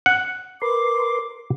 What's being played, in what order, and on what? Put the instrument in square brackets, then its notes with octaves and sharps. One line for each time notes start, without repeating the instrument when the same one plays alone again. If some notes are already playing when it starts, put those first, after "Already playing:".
[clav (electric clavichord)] F#5
[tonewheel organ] A#4 B4 C6 [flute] D6